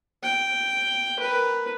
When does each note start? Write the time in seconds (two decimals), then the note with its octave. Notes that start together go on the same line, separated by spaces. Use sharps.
0.23 G5
1.19 A#4 B4